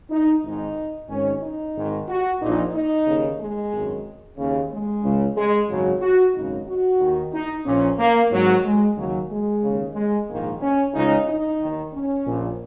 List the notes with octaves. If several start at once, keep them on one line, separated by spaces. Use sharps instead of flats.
D#4
G#1 G#2 D#3 D#4
G#1 G#2 D#3 C#4
D#4
G#1 G#2 D#3
F#4
A#1 A#2 D#4
D#4
D#2 C#3
G#3
G#1 F#2 D#3
D#2 C#3
G#3
C#2 C#3
G#3
G#1 F#2 C#3 F#3
F#4
G#1 F#2 C#3 D#4
F#4
D#2 D#3
D#4
A#1 A#2 C#4
A#3
G#1 G#2 D#3 F#3
G#3
D#2 C#3 F#3
G#3
D#2 C#3
G#3
A#1 G#2 D#3 A#3
C#4
C#2 C#3 D#4
D#4
D#2 D#3
C#4
A#1 A#2